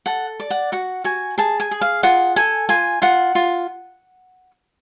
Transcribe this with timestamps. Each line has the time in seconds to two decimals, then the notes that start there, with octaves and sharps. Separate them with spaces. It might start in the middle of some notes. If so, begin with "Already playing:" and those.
0.06 A4 F#5
0.40 D5
0.50 F#5
0.72 F#4 F#5
1.04 F#4 G#5
1.38 G#4 A5
1.60 G#5
1.71 G#4
1.81 F5
2.03 F4 F#5
2.36 A4 G#5
2.69 F4 G#5
3.02 F4 F#5
3.35 F4